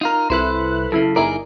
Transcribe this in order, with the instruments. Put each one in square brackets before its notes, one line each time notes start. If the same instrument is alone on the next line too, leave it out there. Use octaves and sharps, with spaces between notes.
[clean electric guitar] D#4 F4 A#4
[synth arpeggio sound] C2 E4 F#6 [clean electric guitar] A4 B4 C5
[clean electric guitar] F#2 C#3 [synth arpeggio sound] E4 A4
[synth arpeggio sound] G1 E4 A#4 [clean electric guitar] D#4 G#4 D5